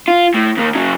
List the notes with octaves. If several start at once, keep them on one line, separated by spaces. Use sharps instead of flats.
F4
A2
D#2 A#3
C#3 F#3